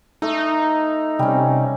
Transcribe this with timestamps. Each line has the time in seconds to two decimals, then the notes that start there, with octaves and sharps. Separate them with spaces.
0.22 A3 D#4
1.19 C3 G3 C#4